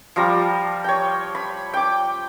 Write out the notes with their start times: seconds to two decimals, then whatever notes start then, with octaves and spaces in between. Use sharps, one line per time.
0.16 F3 G3 A#5
0.84 C#5 G5
1.35 B5
1.74 G5 D6